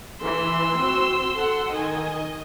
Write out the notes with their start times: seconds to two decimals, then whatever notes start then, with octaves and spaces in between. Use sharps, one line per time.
0.22 E3 C6 E6
0.77 C4 F#4
1.34 A4 F#5
1.72 D#3 D#5 G#5